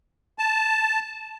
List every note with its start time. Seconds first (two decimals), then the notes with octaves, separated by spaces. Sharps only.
0.39 A5